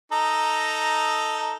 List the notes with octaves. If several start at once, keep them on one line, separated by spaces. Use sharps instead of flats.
D#4 A4 A#5